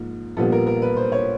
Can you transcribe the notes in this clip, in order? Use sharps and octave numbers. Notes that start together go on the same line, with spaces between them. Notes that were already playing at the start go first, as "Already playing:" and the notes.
Already playing: G#2 F3 A#3
A#1 A#2 G3 B3 A4
A#4
A#4
B4
C5
C#5